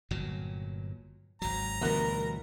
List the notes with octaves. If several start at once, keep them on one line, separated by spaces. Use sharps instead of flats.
G1 A#2 F#3
G#1 F#3 A#5
D2 B2 E3 G3 A#4 F#5